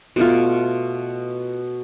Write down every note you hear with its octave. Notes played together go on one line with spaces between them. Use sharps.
B2 A3 F4